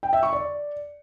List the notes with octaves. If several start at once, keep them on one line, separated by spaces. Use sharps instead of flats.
G5
E5
C#6
D5